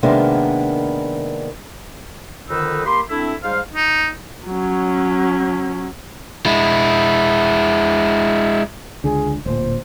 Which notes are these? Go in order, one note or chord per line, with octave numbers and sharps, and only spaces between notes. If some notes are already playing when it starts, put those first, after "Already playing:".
C3 D#3 G#3 A#3 B3 D4
F2 D3 D#3 D#4 B4 E6
A#3 G4 B5 C6
A3 C4 D4 E4
G#2 G3 C5 F5
D#4
F#3 C#4
G#3 E4
C#2 D3 G#4
D1 A#2 C5